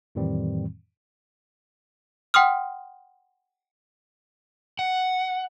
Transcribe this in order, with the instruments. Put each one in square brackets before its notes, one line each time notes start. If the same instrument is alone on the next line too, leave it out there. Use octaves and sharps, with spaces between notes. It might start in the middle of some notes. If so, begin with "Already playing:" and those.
[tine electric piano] F2 A2 D#3 E3 G3 C4
[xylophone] F#5 G5 C6 D#6 F6
[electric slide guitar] F#5